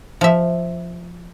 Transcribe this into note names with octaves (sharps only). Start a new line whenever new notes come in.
F3 E5